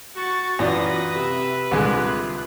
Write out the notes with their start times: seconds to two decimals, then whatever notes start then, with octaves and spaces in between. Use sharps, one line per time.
0.16 F#4 C#6 A6
0.59 F#2 E3 F4 B4 D5 D#6 A#6
1.16 C3 E5
1.71 C2 D3 G#3 F4 F#6